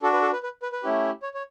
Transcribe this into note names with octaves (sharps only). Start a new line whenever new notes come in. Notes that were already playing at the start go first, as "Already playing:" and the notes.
D4 F#4 A4
B4
A4
B4
B4
B4
B4
A3 C#4 E4 G4
C#5
C#5